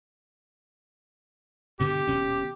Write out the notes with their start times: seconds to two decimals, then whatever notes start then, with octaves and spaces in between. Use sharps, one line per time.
1.80 G2 B2 D3 G4
2.07 D#1 B2 C#4